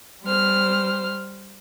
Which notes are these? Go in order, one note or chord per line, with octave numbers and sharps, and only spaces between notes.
G3 C5 F6